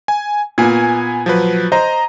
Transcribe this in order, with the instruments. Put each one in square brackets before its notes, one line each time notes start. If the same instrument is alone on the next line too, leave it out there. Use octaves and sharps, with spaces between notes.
[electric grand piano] G#5
[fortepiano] A#2 [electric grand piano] B3 G#5 G#6
[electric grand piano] F3 F#3 B4
[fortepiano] C5 [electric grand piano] D#5 A#5